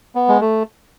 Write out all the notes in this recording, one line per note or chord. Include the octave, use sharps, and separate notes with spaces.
B3
G#3
A3